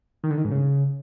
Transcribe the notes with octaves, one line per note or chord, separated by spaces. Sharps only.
D#3
D3
D#3
G#2
C#3